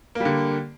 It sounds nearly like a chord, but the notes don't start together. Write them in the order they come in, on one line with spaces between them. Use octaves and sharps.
A#3 G3 D3